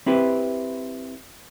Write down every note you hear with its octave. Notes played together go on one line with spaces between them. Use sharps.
C4 E4 G4 B4